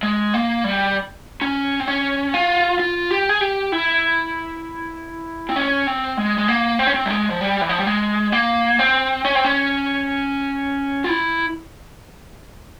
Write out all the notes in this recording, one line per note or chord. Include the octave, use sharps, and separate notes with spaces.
G#3
A#3
G3
C#4
C4
C#4
F4
F4
G4
G#4
G4
E4
C4
C#4
C4
G#3
G#3
A#3
C4
C#4
C4
G3
G#3
F3
G3
E3
F3
G3
G#3
A#3
C4
C#4
C4
C#4
F4
E4